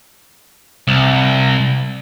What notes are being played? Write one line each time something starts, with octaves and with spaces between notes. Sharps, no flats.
C2